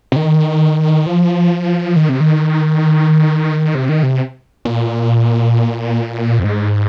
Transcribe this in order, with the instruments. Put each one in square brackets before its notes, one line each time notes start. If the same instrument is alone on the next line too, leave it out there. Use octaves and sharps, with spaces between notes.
[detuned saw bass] C3
D#3
F3
D#3
C3
D#3
C3
D#3
C3
A#2
F2
G#2